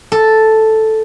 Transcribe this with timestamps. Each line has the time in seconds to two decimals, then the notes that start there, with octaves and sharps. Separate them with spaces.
0.12 A4